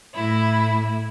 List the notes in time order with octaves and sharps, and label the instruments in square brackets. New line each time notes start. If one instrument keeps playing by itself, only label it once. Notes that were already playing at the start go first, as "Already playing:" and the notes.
[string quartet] A2 E4